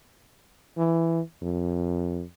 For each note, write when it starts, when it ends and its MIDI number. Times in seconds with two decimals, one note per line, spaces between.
0.78 1.21 52
1.42 2.23 41